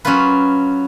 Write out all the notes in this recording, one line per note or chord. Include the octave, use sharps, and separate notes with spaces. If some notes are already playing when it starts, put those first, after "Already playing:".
F#3 C#4 F4 B4